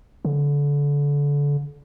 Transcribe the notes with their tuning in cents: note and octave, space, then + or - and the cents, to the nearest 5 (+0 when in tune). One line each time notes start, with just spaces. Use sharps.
D3 -30